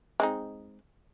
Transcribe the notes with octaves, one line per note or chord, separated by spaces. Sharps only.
G#3 C4 D#4